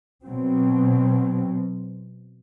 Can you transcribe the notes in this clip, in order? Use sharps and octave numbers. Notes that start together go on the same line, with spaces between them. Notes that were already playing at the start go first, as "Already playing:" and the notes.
B2 F#3 C4